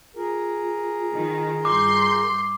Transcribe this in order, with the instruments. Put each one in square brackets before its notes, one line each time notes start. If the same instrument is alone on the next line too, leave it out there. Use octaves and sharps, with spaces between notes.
[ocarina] F4 [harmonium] G#4 A#4
[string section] D#3
[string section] G2 C6 G6 [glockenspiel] D6